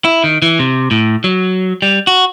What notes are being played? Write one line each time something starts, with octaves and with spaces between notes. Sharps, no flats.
E4
D#3
E3
C3
A2
F#3
G3
F#4